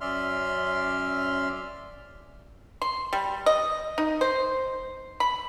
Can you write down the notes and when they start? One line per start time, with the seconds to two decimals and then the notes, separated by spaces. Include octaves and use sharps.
0.01 F#2 C#4 D5 E5 C6 F6
2.82 C6
3.13 G3
3.46 D#5
3.98 D#4
4.21 C5
5.20 B5